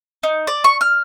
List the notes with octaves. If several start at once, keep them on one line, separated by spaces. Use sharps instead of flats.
D#4
D5
C#6
F6